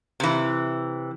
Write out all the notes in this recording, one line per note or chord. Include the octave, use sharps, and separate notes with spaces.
C3 E3